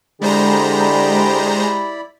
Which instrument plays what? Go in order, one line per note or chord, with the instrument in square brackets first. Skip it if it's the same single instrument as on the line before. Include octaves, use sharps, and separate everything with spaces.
[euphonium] D3 [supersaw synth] G#3 C5 A#5 [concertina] E4 D5 B5 [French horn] G4